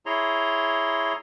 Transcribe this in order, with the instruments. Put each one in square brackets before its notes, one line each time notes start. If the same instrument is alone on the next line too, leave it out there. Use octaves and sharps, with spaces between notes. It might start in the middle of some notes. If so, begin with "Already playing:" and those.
[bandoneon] E4 G#4 C#5 A#5 C6